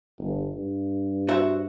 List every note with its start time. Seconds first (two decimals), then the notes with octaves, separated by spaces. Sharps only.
0.19 G1
0.55 G2
1.29 F#4 C5 E5